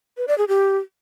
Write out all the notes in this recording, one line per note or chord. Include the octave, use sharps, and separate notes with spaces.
B4
D5
G#4
G4